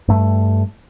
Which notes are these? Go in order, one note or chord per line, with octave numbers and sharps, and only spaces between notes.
G2 A3